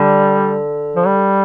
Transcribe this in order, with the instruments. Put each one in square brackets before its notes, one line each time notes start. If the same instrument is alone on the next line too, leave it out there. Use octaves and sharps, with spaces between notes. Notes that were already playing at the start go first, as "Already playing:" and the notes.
Already playing: [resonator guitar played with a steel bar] D3 [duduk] G3
[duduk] F3
G3